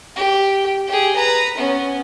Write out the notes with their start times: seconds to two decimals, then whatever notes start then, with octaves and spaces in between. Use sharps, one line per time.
0.16 G4
0.88 G4 G#4
1.16 B4 A#5
1.57 B3 C#4